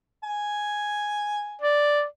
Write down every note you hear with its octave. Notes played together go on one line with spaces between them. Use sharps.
G#5
D5